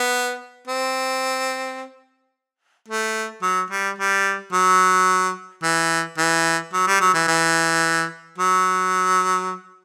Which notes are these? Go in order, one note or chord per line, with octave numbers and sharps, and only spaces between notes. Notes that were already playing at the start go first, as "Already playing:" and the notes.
Already playing: B3
C4
A3
F#3
G3
G3
F#3
E3
E3
F#3
G3
F#3
E3
E3
F#3